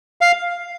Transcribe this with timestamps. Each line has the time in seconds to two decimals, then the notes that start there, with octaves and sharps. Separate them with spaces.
0.21 F5